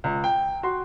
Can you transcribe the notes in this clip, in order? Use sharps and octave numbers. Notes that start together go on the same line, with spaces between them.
C#2
G5
F#4 C6